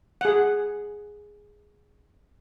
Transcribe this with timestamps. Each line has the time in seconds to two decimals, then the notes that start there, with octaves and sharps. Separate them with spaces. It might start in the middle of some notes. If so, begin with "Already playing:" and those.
0.21 G#4 F#5